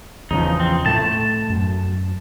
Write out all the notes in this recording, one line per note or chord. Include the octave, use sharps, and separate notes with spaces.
E2 C#3 F3 D#4
C4
A2 A3 A5
F#2